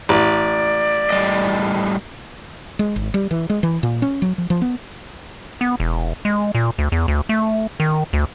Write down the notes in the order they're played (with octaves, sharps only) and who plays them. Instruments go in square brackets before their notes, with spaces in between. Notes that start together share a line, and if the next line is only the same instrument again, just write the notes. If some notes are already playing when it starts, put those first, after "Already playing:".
[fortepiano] A1 [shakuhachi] D5
[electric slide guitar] A2 G3 D#5
[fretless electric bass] G#3
G#1
G3
E3
G#3
E3
A#2
C#4
F#3
F3
F3
B3
[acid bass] B3
E1
G#3
A#2
D2
E2
D2
A3
D#3
D2